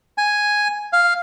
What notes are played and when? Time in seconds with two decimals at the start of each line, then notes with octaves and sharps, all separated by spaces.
0.18 G#5
0.93 F5